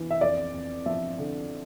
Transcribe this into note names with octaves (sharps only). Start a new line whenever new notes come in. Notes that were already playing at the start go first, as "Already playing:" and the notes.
Already playing: E3
E5
F2 D5
F2
F3 E5
D3